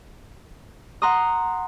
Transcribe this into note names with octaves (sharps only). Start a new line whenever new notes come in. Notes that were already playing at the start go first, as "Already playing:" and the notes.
F#5 A#5 C6 D#6